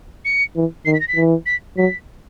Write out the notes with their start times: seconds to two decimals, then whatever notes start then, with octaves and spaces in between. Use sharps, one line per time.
0.25 C#7
0.56 E3
0.85 D#3 C7
0.94 B6
1.00 A#6
1.08 B6
1.16 E3
1.46 B6
1.77 F#3 B6